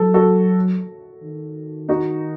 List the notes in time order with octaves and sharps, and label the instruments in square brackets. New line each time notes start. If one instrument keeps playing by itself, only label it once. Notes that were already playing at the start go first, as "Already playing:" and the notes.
Already playing: [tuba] F#3 [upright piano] A4
[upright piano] F#4 A4
[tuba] D#3
[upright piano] D#4 F#4